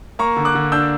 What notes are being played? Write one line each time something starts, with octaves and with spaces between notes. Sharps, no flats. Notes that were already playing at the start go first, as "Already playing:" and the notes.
A#3 A#5 C#6
D3
D6 F#6
D3
D4 E6 G6